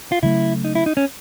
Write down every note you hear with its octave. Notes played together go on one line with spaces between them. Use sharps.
F4
C#3 F#3 A3 E4
D#4
E4
D#4
C#4